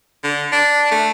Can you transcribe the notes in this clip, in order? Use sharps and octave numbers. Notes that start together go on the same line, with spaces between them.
D3
D4
A3